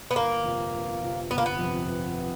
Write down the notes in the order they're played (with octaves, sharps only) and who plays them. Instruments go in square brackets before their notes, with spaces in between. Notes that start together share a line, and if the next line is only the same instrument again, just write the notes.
[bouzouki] B3
[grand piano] G1 [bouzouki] A#3
[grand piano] F2 C3 F3
G1
F2 C3 F3
[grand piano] G1 [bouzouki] B3
[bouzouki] A#3
B3
[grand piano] F2 C3 F3
G1
C3